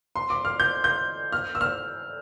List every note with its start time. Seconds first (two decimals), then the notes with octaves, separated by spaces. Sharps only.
0.16 C6
0.30 D6
0.45 F6
0.60 G6
0.84 G6
1.32 F6
1.55 E6
1.61 F6